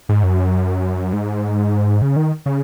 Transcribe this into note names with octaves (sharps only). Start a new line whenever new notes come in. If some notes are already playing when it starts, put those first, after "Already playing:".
G#2
F#2
G#2
C#3
D#3
C#3